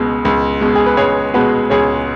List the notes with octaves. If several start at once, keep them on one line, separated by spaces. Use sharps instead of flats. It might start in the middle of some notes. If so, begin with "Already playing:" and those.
Already playing: C#2 B2 G#3
C#2
B2 G#3
G#4
B4
C#2 G#4 C#5
B2 G#3 F#4 B4
C#2 G#4 C#5